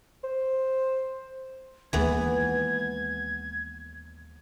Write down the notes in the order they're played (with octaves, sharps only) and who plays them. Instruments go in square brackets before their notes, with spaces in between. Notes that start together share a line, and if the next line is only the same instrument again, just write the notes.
[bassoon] C5
[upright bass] D#2 G#3 [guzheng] E3 B3 [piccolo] G#6